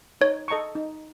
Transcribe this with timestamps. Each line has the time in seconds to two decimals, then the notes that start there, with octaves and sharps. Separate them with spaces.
0.21 D#4 C#5
0.48 A4 D#5 A#5 C#6
0.75 D#4